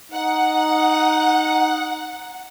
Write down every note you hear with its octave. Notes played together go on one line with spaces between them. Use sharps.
D#4 F#5